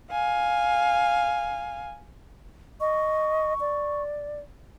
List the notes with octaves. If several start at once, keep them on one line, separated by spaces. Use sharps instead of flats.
F5 G#5
D#5 C#6
D5